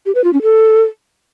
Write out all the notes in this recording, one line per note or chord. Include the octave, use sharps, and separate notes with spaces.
G4
B4
F4
C#4
A4